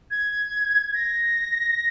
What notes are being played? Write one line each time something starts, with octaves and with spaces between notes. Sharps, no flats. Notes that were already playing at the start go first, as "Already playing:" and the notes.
G#6
A#6